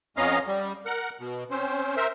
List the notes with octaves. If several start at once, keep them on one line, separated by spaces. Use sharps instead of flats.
F2 B3 C#4 D#5 F5 A#5
G3
A#4 F#5
B2
C4 C#4 C5
A#4 C5 E5